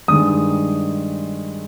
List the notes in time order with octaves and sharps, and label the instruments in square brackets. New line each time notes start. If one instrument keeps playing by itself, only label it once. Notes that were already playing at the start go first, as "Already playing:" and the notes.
[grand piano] G2 D#3 G#3 D#6